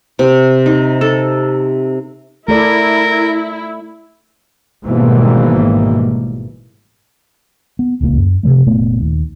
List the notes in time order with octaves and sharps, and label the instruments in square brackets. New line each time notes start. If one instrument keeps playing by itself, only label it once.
[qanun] C3
D#4
A4
[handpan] A3 A4 D5 [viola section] E4 [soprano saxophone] A#4
[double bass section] G#1 G#2 B2 E3 G3 A#3
[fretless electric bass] B3
D#1 C#2 B2 A#3
F#2
C3 E3 F3 A3
F#1 A#2 A3 B3
D#2